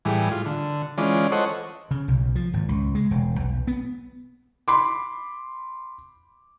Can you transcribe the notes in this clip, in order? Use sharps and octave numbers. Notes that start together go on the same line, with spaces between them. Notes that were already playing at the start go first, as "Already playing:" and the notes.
A2 E3 G3 G#4
F4
D3
E3 G#3 C#4 F4 D5
A4 C5 C#5 D#5 F#5
C#3
B1
F3
G#1
C#2
G#3
E1
B1
B3
B5 C6 D6